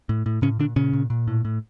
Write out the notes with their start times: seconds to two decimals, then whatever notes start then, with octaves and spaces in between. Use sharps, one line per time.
0.09 A2
0.26 A2
0.42 A2 C#3 C#4
0.59 A#2 D3 D4
0.76 A#2 C#3 C#4
0.93 A#2
1.10 A#2
1.28 A2
1.45 A2